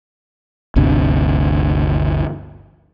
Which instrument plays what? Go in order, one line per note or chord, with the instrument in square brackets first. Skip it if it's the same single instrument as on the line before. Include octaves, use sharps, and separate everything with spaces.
[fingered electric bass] G1 D2 C3